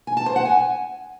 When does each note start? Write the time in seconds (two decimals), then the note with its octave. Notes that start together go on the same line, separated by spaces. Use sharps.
0.07 G#5
0.17 A5
0.26 C5
0.36 F#5
0.45 G#5